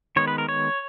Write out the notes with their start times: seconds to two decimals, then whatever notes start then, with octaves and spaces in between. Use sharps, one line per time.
0.16 D#3 G#3 B3 C#5
0.28 B4
0.38 A#4
0.49 C#5